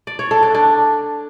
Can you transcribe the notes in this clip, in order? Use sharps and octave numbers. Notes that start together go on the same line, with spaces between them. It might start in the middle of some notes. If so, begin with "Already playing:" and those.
D5
C#5
A4
D4
D4